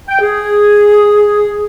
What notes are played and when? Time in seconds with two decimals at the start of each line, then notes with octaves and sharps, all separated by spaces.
0.08 G5
0.20 G#4